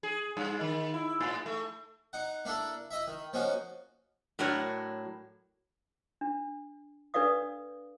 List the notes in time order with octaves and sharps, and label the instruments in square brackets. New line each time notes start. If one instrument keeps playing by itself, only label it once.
[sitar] G#4
G2
D#3
E4
A2
A3
[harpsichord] D#4 F#5
A#3 D4 E4 A4
E4 D#5 E5
D#3
F3 A#3 C#4 D#4 F#4
[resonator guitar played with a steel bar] A2 F#3 D4 F#4 A#4 C#5
[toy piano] D4
D4 A4 B4 D5 F5 D#6